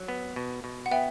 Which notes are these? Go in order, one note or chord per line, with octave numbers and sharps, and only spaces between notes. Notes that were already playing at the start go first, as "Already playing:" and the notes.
Already playing: F#3
B3
B2
B2
F#5
B3 E5 G5